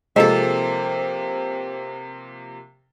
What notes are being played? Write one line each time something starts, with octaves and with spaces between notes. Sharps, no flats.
C3 F3 G#3 A#3 C4 A4 E5